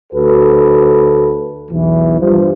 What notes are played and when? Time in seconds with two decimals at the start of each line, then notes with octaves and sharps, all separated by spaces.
0.12 D2 F#4 A4 B4
1.71 B1 E2 E3
2.19 G2 F3